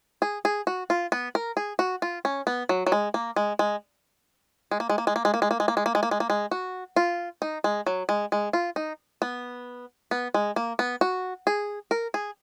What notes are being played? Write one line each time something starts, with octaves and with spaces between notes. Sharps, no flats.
G#4
G#4
F#4
F4
B3
A#4
G#4
F#4
F4
C#4
B3
F#3
F#3
G#3
A#3
G#3
G#3
G#3
A#3
G#3
A#3
G#3
A#3
G#3
A#3
G#3
A#3
G#3
A#3
G#3
A#3
G#3
A#3
G#3
A#3
G#3
F#4
F4
D#4
G#3
F#3
G#3
G#3
F4
D#4
B3
B3
G#3
A#3
B3
F#4
G#4
A#4
G#4